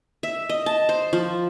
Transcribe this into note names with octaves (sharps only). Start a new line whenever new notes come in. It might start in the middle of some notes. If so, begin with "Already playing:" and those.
E5
D#5
A5
C5
F3